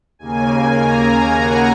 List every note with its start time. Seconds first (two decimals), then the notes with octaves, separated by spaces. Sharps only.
0.19 D#2 C#3 A#3 G#5
0.78 A#5
1.08 G#5
1.37 F#5